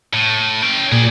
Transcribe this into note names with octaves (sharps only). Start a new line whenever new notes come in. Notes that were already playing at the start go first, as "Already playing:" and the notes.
A2
C#4 G5
A#2 G#4 D5